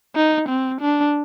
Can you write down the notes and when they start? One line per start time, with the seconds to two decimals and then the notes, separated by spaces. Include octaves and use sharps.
0.16 D#4
0.49 C4
0.81 D4